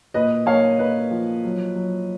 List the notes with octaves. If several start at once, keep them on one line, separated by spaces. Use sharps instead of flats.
A#2 B4 D#5
A#3 C#5 F5
A#3 B4 D#5
F3
F#3
F#3